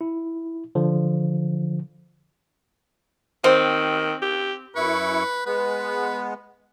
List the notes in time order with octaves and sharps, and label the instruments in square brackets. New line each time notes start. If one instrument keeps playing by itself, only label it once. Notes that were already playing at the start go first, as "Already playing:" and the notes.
[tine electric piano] E4
D3 F3
[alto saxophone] D#3 [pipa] C4
[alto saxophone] G4
[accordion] F#2 E4 C#6 [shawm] B4
[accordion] G#3 B3 [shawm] B4